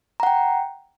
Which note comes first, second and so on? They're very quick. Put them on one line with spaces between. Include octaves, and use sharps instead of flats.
A#5 F#5 G5